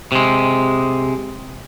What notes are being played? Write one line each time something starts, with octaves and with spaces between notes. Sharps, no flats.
C3 G#3